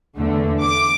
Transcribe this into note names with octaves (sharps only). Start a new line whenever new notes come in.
E2 D3 A3
D6